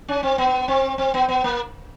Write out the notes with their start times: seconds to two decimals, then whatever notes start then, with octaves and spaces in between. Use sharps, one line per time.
0.08 C#4
0.23 C4
0.38 B3
0.68 C4
0.98 C4
1.14 B3
1.29 B3
1.44 A#3